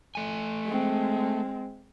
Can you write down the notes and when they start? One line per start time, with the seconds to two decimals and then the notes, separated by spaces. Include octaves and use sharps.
0.15 A3 G#5
0.67 G#3 C4